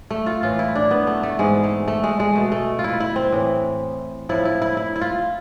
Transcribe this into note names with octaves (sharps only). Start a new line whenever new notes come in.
A3
F4
A2 E3 F4
E4
D4
B3
A3
A3
G#2 E3 G#3
A3
A3
G#3
G#3
B2 A3
A3
F4
E4
E4
C4
A2 E3
A2 F3 E4
E4
E4
E4
E4
F4